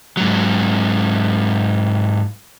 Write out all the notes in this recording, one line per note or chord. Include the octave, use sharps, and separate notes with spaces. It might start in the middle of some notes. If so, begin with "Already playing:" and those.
G#2 F#3